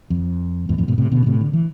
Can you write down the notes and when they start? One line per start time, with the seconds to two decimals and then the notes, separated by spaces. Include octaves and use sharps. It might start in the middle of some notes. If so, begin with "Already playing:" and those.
0.10 F2
0.69 E2 G#2
0.78 F2 A2
0.88 G#2 B2
0.98 A2 C3
1.12 B2 D3
1.22 D3
1.26 A2 C3
1.41 D3
1.53 E3